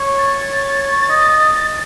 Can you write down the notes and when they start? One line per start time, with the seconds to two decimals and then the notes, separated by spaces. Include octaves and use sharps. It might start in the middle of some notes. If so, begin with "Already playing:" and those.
Already playing: C#5
0.19 A6
1.09 D#5